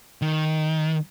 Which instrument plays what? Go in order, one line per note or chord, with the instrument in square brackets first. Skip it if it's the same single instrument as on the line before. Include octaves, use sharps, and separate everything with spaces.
[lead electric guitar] D#3